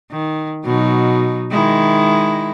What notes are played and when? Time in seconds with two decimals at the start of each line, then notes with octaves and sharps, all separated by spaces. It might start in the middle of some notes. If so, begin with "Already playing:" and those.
0.11 D#3
0.64 B2 F#3 D#4
1.51 D#3 G#3 E4